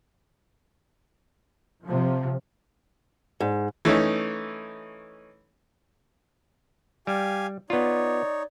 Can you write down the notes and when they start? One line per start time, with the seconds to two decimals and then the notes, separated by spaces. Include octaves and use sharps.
1.84 C3 F3
3.41 G#2
3.85 E3 A3 C#4 D#4
7.07 G3 G4 F5 G#5
7.70 B3 D#4 F4 C#5 D5